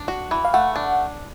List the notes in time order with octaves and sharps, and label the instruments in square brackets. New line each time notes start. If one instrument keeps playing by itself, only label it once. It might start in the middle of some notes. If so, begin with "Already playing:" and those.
Already playing: [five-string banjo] D4
F#4
E3
[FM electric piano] F5
[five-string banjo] A3 [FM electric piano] F#5
[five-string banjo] D4